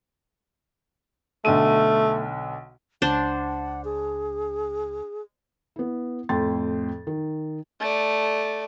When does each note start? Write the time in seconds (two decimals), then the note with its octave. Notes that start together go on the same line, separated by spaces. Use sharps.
1.45 B1 D3 A3 D#7
3.02 C#2 D4 C5 F#5
3.84 G#4
5.76 B3 E4
6.29 F2 A2 G5 C6 A6
7.07 D#3
7.80 A3 D5